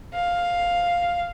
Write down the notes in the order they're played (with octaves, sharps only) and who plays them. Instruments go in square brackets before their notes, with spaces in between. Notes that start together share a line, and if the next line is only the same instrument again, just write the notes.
[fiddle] F5